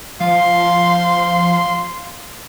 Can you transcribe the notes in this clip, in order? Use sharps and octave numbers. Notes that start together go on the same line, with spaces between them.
F3 F5 C6